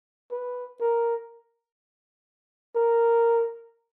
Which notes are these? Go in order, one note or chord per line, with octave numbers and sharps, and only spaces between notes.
B4
A#4
A#4